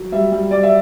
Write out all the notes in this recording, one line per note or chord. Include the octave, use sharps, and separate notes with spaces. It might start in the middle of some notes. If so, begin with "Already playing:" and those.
Already playing: F#3
G3 E5
G3
G3 D5
E5